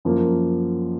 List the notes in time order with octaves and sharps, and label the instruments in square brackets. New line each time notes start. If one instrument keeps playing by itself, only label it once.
[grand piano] F#2 F3 A#3